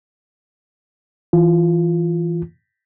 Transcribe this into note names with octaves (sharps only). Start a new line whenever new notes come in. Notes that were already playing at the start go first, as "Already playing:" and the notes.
E3 F4